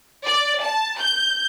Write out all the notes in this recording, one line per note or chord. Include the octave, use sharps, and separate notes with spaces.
D5
A5
G6